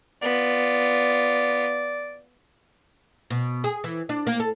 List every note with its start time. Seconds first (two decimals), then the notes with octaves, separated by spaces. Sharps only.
0.22 B3 F4 D5
3.30 B2
3.64 G#4
3.84 E3
4.09 D4
4.27 A#3
4.40 A4